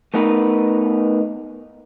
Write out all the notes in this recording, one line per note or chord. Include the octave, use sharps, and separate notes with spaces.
A3 B3 D#4 A#4 B4